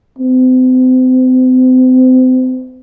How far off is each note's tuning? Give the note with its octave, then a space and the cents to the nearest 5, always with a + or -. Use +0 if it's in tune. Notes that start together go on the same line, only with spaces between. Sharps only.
C4 -35